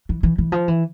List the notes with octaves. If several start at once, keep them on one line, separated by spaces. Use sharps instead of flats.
E3
E3
E3
F3
E3